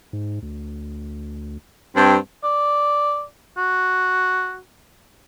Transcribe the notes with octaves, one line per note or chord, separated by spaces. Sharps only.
G#2
D2
G2 C4
D5
F#4